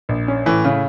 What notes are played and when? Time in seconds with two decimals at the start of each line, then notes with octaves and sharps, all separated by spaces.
0.09 A#1
0.28 C#4
0.46 A2 E3
0.65 C#3 C#4